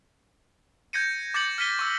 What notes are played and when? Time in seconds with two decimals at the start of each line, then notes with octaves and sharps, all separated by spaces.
0.93 G6 G#6 A#6 C#7 D#7
1.34 D6 G6 A6 A#6 C#7 F#7
1.58 F6 A#6 B6 D#7 G7
1.79 C#6 E6